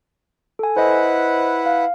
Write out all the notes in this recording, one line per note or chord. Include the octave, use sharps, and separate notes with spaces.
A4 G#5
E4 B4 C5 D#5 F#5
F5